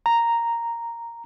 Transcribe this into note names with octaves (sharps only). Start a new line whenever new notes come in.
A#5